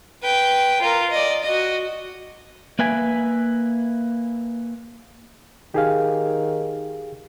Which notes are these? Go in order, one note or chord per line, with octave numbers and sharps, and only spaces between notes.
B4 G5
F4 A#4
D5 D#5
F#4 D#5
A#3 B4 E5 G#5
D#3 G4 G#4 F5